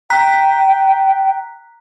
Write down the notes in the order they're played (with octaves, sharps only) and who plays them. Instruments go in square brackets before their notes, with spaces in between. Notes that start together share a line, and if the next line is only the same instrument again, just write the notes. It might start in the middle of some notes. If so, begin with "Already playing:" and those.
[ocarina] G5 [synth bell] A#5 F#6 B6